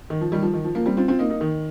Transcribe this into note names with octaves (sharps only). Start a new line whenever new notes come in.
D#3
F3
D#3 G3
F3
D#3
F3
F3 A#3
G3 C4
C4 F4
C4 F4
A#3 D#4
A#3 D#4
D#3